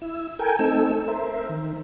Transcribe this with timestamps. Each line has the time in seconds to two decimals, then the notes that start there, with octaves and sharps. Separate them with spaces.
0.02 E4 E6
0.39 A4 A#4 G5 G#5
0.59 A3 C4 D#4 A4 E6
1.08 A#4 C5 E5
1.49 D#3